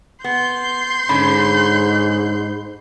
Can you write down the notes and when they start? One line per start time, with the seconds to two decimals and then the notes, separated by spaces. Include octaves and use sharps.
0.24 B3 C6 G6
1.09 G#2 D3 C#4 B5